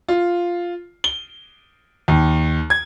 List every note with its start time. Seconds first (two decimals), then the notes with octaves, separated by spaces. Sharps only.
0.08 F4
1.04 G7
2.08 D#2
2.70 G#6